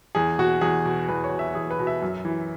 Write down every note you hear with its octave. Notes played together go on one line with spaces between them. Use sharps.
E2 G#4
B2 F#4
E2 G#4
B2
E2 B4
C#5
B2
E5
E2 G#4
B4
B2
E5
F#2
E3